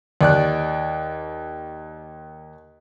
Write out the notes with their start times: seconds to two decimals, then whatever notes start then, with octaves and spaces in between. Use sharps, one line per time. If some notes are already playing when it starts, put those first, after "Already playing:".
0.21 D#2 D5 F#6